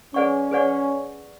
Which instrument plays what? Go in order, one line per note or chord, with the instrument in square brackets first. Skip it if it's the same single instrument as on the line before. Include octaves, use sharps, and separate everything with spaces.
[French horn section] C#4 [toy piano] G#4 B4 D5 F#5 C#6
[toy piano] G#4 B4 D5 F#5 C#6